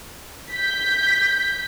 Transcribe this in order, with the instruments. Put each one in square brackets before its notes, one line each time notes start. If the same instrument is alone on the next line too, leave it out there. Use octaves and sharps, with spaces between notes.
[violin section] G6 B6